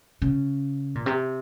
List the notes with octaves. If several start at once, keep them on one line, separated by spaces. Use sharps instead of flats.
C#3
A#2
C3